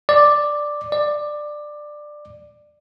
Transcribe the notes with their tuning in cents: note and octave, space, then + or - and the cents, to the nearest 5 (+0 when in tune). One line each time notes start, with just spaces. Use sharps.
D5 +5
D5 +15